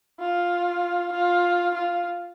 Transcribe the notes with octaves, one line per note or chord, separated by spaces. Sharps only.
F4
F4
F4